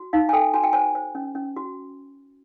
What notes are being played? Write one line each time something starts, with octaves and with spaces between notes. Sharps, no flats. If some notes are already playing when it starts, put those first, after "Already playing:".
Already playing: F#4
D#4 F5
G#5
A4 G5
F#4 G#5
G5
C5 G#5
C5
C#4
C#4
F#4